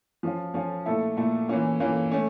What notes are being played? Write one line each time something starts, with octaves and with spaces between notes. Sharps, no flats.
F3 C#4 F4
F3 C#4 F4
A#2 A3 E4 A4
A#2 A3 E4 A4
E3 A#3 C#4 F4
E3 A#3 C#4 F4
A3 C#4